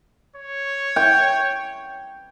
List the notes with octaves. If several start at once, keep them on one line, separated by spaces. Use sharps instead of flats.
C#5
G5